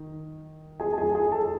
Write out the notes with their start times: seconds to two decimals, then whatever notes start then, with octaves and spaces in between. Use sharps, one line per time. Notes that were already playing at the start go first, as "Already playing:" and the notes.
Already playing: D#3
0.80 G#4 G#5
0.92 A5
0.98 G#4 G#5
1.15 G#4 G#5
1.32 A4 A5